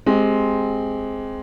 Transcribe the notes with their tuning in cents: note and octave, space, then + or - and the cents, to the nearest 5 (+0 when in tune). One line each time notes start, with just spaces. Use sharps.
G#3 +10 C4 +0 G4 +0